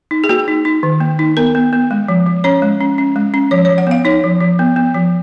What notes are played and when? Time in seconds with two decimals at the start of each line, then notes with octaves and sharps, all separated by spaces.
0.11 D#4
0.24 G#4
0.29 A#3 F#4
0.48 D#4
0.65 D#4
0.83 D#3
1.01 A#3
1.19 D#4
1.37 B3 A#4
1.55 B3
1.73 B3
1.91 G#3
2.08 F3
2.27 F3
2.44 C#4 C#5
2.62 G#3
2.81 C#4
2.98 C#4
3.16 G#3
3.34 C#4
3.51 F3 C#5
3.65 C#5
3.69 F3
3.78 F#5
3.87 B3 F5
4.05 D#4 C#5
4.24 F3
4.41 F3
4.59 B3
4.76 B3
4.94 F3